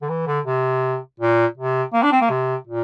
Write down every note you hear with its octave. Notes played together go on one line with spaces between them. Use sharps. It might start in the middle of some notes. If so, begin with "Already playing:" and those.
D3
E3
D3
C3
A#2
C3
A#3
D4
C4
A#3
C3
A#2